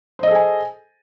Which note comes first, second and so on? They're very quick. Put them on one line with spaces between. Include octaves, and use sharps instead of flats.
C5 D#5 A4 G#4 G#5